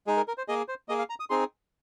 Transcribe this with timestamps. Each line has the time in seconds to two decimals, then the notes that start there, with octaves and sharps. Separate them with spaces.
0.07 G#3 D#4 G#4
0.17 A#4
0.28 A#4
0.38 C5
0.48 A#3 G#4 D#5
0.68 C5
0.89 A#3 G#4 D#5
0.99 F5
1.10 A#5
1.20 D#6
1.30 C4 D#4 G#4 C6